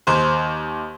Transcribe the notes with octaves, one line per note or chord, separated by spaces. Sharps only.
D#2 C5